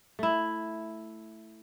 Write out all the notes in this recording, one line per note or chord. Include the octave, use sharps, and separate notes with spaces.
A3 E4